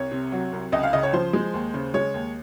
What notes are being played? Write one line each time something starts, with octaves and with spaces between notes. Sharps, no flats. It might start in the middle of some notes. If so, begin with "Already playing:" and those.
Already playing: C2 C#5
C3
F#3
C2
C#2 D#5
F5
C#3 D#5
C#5
F3 C5
G#3
D#2
C#3
G#3 C#5
D#2